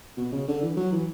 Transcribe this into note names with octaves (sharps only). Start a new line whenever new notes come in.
B2
C#3
D3
E3
F#3
E3